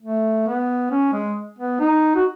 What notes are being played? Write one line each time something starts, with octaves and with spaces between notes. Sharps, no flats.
A3
B3
C#4
G#3
B3
D#4
F#4